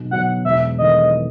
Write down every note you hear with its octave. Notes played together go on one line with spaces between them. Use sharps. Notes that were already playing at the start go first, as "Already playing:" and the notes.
Already playing: B1
B2 F#3 F#5
E1 E5
E2 D#3 A3 D#5